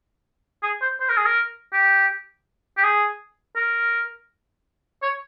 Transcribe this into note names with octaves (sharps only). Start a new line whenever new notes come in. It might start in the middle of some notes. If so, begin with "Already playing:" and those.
G#4
C5
C5
A#4
G#4
A#4
G4
G4
G#4
A#4
C#5